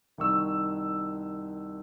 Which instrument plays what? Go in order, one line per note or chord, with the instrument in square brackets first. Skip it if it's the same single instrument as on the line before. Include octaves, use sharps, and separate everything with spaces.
[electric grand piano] C2 D#3 C#6 E6